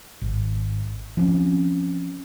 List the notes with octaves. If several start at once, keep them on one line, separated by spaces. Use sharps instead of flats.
G#1
F3 C4 C#4